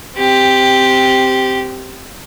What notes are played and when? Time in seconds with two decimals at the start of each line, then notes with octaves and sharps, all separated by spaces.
0.16 C4 G4